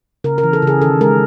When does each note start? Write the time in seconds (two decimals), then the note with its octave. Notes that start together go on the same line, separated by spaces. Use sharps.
0.24 C#3 A#4
0.38 A#4
0.43 E3
0.53 A4
0.62 C#3
0.67 G#4
0.81 D#3 A4
1.01 G#3 A#4